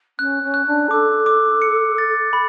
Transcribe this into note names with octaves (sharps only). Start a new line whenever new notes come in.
C#4 F#6
C#4
F#6
D4
A4 D6
D6
C#7
A6
B5